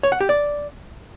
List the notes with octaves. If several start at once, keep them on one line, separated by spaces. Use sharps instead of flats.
C#5
F#5
G4
D5